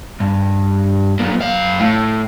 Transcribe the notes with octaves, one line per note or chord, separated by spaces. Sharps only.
G2
B1 A#2
F#2 F5
A2